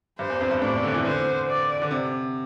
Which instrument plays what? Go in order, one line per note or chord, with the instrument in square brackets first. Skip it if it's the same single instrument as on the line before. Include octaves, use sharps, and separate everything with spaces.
[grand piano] G2 [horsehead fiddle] C5
[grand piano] E2
F2
G2
[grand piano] A2 [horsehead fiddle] D5
[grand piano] C3
D3
E3
[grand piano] D3 [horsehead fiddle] C5
[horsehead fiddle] D5
[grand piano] D3
C3